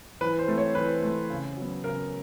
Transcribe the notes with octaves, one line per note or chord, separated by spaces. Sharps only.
E3 B4
C5
A3 C4
C#5
E3 B4
A3 C4
C#3
F#3
B3
C#3 A#4